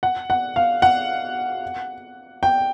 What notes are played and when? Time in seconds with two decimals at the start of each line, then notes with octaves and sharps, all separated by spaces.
0.03 F#5
0.30 F#5
0.56 F5
0.82 F#5
2.43 G5